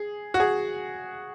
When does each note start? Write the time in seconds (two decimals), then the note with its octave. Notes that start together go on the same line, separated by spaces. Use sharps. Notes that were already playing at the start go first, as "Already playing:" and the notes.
Already playing: G#4
0.34 F#4
0.40 G#4